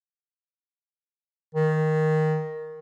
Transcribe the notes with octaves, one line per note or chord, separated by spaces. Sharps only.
D#3